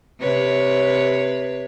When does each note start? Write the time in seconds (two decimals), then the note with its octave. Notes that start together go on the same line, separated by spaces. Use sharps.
0.20 C3 B4 C#5